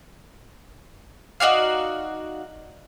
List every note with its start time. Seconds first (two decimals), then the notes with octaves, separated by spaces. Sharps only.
1.40 D#4 F#4 D5 F5